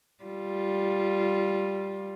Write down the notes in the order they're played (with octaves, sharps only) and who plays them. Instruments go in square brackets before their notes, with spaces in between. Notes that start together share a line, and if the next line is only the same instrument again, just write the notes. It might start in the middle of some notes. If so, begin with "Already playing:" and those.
[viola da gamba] G3 F4